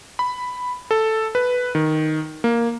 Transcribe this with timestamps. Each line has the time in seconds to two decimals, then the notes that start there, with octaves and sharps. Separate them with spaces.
0.19 B5
0.91 A4
1.35 B4
1.75 D#3
2.44 A#3